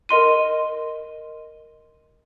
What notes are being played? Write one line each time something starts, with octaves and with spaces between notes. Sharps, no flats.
A#4 D#5 C6 D#7